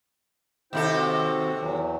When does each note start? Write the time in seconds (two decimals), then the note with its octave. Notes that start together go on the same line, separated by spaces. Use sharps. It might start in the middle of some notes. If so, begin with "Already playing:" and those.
0.73 D#2 C3 E4 A4 C5 G5
0.93 C4 F#4
1.60 E2 E3 F#3